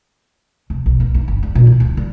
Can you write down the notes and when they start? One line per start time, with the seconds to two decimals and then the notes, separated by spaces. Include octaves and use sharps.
0.70 C2
0.86 B1
1.00 B3
1.14 D#4
1.28 G1
1.43 G3
1.55 A#2
1.67 E4
1.80 D2
1.97 G3